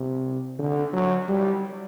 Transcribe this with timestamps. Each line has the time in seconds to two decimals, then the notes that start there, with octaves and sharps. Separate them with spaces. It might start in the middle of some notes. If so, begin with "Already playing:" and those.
Already playing: C3
0.59 D3
0.93 F#3
1.28 G3